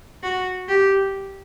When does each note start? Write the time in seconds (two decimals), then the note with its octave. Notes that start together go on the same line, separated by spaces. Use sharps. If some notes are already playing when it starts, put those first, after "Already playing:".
0.23 F#4
0.69 G4